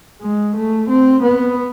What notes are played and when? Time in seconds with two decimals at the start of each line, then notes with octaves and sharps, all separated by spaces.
0.22 G#3
0.56 A3
0.90 C4
1.23 B3